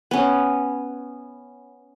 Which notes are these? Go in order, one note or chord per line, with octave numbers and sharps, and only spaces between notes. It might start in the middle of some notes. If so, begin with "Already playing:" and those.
B3 C#4